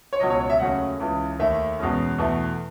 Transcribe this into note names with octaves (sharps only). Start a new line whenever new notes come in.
C#5
C#2 B2 F#3 D#5
C#5
C#5
E5
D#2 C#3 F#3 A3 C#4 F#5
C#2 C#3 E3
D#2 D#3 A3 E5
E2 B2 G#3 C#4
E2 B2 A3 E4